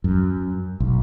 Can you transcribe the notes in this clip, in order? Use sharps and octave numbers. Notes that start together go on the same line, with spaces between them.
F#2
B1